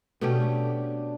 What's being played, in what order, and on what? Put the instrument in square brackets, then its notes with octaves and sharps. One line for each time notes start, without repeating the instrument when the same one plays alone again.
[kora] B2 A3 C#4 G4 [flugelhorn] D4